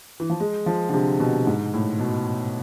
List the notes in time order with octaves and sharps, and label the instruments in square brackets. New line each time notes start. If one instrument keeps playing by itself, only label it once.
[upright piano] E3
F3
G#3
F3
D3
C3
B2
G#2
A2
B2